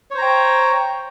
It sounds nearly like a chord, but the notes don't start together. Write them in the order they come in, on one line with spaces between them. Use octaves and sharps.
C#5 C5 A#5 G5